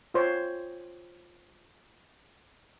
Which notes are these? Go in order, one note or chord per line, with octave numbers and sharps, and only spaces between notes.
F4 C5 C#5